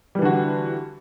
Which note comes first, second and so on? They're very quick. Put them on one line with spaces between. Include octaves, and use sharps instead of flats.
G3 E3 D3 F#4